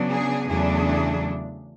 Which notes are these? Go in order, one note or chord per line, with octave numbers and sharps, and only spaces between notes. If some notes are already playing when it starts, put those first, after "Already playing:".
Already playing: C#3 F#3 B3 D4
G#4
E2 C#3 F#3 A3 D4 G#4